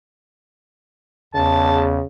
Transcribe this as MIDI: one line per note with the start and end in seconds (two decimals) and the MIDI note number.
1.34 2.01 40
1.34 2.06 49
1.34 1.81 81